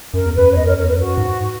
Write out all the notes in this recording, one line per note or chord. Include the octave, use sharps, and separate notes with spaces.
F#2 A#4
E2
F#2 B4
C#5
E2 B4 D#5
A#4 C#5
F#2
A#4 C#5
E2 B4
F#2 F#4
G#2